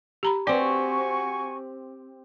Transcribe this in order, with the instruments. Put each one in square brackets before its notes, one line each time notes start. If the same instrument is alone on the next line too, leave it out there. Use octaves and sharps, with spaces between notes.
[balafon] G4 A#5 B5
[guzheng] C4 G4 [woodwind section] F#4 G#5 C#6 [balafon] D5